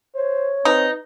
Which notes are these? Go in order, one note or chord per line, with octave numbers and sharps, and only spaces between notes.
C5 C#5
C4 D#4 B4